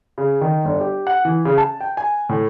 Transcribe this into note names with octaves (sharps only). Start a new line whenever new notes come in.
C#3
D#3
G1
G4
F#5
E3
C#3
A5
G5
G#5
A2